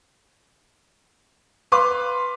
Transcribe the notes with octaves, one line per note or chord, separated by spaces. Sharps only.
B4 F5 C6 D6